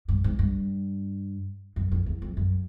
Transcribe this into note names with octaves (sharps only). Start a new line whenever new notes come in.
G2
G#2
G2
F#2
F2
E2
F2
F#2